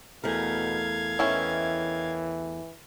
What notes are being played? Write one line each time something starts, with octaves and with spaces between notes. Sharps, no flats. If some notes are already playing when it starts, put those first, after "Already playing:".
E2 B2 A3 A#4 F5 G#6
D#3 E3 C#4 E4